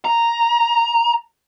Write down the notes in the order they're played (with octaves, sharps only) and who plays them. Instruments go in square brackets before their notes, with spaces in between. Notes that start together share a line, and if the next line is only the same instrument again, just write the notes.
[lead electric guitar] A#5